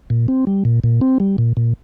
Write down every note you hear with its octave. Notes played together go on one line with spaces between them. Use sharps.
A#2
C4
G3
A#2
A#2
C4
G3
A#2
A#2